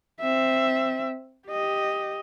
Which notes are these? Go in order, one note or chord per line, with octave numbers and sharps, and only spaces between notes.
C4 E5
G4 D#5